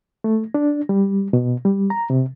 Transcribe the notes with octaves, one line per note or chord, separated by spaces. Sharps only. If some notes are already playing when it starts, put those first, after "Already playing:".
A3
D4
G3
B2
G3
A#5
C3